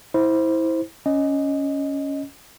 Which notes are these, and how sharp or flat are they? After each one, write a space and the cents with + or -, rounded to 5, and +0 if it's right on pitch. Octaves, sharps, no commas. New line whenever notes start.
E4 -20 C5 +0
C#4 +5 D#5 +0